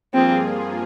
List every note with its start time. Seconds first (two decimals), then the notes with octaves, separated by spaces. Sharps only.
0.13 G2 F3 A#3 C4 F4 G#4